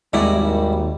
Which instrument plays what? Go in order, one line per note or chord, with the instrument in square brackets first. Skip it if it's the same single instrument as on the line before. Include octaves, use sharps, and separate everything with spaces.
[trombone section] G#1 G3 [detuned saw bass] D#2 [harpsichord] G#2 F#4 [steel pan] E4 D5 D#5